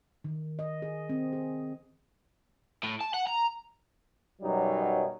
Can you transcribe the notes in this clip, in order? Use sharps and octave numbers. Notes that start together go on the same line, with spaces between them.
D#3
D#5
G#4
C4
G#4
A2
A5
F#5
A#5
F#2 B2 F#3 G3 D#4